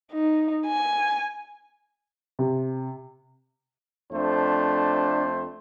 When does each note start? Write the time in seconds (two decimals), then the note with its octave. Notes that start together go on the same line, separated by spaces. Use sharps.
0.12 D#4
0.67 G#5
2.39 C3
4.12 F2 A3 D4 C5